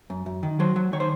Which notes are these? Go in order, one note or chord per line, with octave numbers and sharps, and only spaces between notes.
F#2
F#2
D#3
F#3 C5
F#3
D#3 C#5
C5